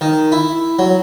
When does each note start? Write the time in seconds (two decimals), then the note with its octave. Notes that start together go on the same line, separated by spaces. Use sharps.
0.01 D#3
0.32 E4
0.79 F#3